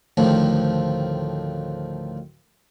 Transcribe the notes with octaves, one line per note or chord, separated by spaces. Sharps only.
D2 A2 D#3 F3 C4